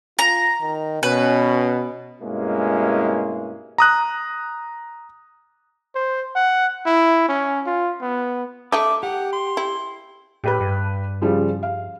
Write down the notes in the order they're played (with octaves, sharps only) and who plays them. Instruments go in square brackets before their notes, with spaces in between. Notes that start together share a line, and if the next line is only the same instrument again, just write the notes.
[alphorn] F4 [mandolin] A#5
[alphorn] D#3
[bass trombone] B2 [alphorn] C#4 [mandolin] B4
[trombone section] G2 B2 G#3 A#3 C#4 E4
[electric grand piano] A#5 D#6 F#6
[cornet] C5
F#5
E4
C#4
F4
B3
[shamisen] A3 D4 D#4 [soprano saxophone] E5 [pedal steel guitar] D6
[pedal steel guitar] G4 [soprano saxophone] F#5
[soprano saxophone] C6
[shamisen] E4
[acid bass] A2 [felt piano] G4 B4 B5
[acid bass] G2
[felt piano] C#3 F3 G3
F5